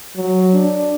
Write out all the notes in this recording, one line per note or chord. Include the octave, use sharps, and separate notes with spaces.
F#3
D4